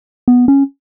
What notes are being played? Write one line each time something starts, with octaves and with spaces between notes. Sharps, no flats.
B3
C#4